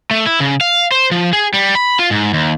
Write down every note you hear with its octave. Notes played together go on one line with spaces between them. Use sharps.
A3
E4
C#3
F5
C5
F3
G#4
G3
B5
F4
G#2
D#2